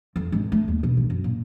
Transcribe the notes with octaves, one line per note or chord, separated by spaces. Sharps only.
F2
G#1
A3
D#2
B2
A1
F#2
A#2